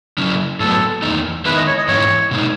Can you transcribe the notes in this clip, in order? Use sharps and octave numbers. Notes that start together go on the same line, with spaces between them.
C#3 F#3 C#4 E4
A2 F#3 B3 A4
E2 D#3 A3 D#4
D#3 G#3 B3 E4 B4
D#5
C#5
D#5
G#2 E3 G#3 C#4 E4 C#5
B2 G#3 D#4